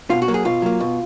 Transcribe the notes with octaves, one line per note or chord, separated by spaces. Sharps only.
B2 F4
F#4
F#3 A#3
G#4
B2 F4
F#3 A#3
B2